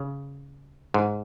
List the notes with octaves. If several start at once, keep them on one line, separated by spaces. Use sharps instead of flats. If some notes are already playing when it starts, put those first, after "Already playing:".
Already playing: C#3
G#2